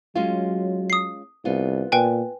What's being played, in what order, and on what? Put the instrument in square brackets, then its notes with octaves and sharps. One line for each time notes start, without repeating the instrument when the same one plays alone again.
[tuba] F#3 [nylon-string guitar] G#3 C#4 F4
[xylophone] D#6 C7
[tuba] C2 [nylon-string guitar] B3 F4
[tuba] A#2 [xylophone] B4 G5 G#5